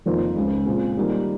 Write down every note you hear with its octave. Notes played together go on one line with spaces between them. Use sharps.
F2 D#3 A#3 F4 C5
C#2 C#3 G#3
A#2 G#3 C4 F4 G#4
D#3 G3 A#3 F4